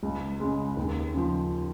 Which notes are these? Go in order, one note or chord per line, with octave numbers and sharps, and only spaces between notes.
C#2
C#3 G#3
D#2
C#3 F3